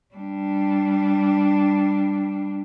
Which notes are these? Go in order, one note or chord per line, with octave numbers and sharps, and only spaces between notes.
G3 D4